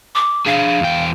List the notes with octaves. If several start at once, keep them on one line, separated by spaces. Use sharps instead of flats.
D6
D4 G#4 F5
E2 G5